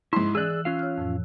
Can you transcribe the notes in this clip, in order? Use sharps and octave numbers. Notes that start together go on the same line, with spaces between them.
G#2 E4 C6
E3 G#4 D5 E6 F#6
C#4 F4 F5
C#5 F6
F2 A2 F3